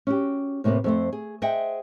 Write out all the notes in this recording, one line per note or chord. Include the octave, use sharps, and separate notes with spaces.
C#4 F#4 G4
A2 C3 A#3 B3 B4
F2 A3 C5
G#4
G#4 C5 D#5 E5 F#5 G5